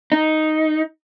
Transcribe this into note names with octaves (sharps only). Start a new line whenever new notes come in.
D#4